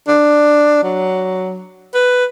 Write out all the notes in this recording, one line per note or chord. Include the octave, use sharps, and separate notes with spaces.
D4
F#3
B4